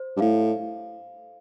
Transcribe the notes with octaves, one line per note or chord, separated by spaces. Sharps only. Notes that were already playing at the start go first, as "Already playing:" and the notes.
Already playing: C5
G2
A2 F5